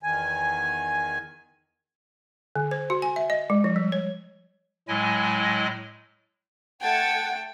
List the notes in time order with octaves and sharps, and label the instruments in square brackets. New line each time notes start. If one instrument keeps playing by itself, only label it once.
[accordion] E2 D#3 G#5
[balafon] D3
C5
F#4
G#5
E5
D#5
G#3
F3
G3
C#5
[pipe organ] A2 F#3 G#3 E4 D#5 G#5
[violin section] A3 A5 G#6 [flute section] F#5 [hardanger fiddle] G5